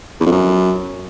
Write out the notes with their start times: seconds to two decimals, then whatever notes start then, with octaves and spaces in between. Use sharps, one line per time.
0.21 E2
0.26 F2
0.32 F#2